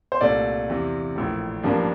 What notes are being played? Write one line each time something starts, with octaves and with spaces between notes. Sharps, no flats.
C5
C2 A#2 A3 D5
E2 C3 E3
A#1 A2 E3
A1 G2 F3 A#3 D4